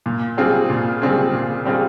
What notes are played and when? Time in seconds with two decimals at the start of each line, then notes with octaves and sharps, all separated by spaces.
0.06 A#2
0.37 G3 C4 F4 G#4
0.70 A#2
1.02 G3 C4 F4 G#4
1.33 A#2
1.65 G3 C4 F4 G#4